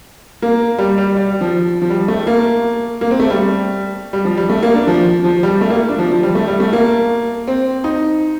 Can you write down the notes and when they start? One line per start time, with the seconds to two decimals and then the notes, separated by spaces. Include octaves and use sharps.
0.42 A#3
0.78 G3
0.98 G3
1.17 G3
1.41 F3
1.82 F3
1.90 G3
2.08 A3
2.27 A#3
3.01 A#3
3.11 C4
3.20 A3
3.30 G3
4.13 G3
4.25 F3
4.37 G3
4.50 A3
4.63 A#3
4.75 D4
4.87 F3
5.24 F3
5.43 G3
5.61 A3
5.70 A#3
5.89 D4
5.99 F3
6.11 F3
6.23 G3
6.35 A3
6.48 G3
6.60 A3
6.73 A#3
7.48 C4
7.84 D#4